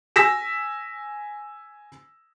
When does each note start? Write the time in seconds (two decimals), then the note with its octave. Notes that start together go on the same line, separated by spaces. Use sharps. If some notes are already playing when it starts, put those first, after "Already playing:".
0.16 G#5 E6 A#6 B6 E7